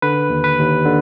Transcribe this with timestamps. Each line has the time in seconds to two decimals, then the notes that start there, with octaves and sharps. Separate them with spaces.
0.02 D3 B4
0.30 D#2
0.44 B4
0.59 D#2
0.85 D3